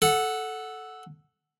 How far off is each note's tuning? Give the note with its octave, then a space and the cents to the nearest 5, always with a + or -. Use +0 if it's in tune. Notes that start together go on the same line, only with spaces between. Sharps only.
A4 -10 F#5 +0